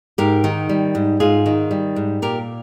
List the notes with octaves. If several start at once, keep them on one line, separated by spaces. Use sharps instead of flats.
G#2 G4 A#4
D#3
G3
G#2
G#2 F4 G#4
D#3
G3
G#2
A#2 G4 A#4